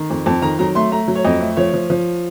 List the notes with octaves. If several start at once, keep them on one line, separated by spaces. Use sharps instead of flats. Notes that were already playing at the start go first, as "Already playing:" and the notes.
Already playing: D#3
F2
F2 A5
D#3 A#5
F#3 A#5
A3 C6
A3 A#5
F#3
C#5
F2 D#5
A3
F3 C#5
F3
F3